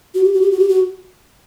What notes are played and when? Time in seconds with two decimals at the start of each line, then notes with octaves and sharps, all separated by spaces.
0.15 F#4
0.24 G4
0.33 F#4
0.41 G4
0.51 F#4
0.59 G4
0.69 F#4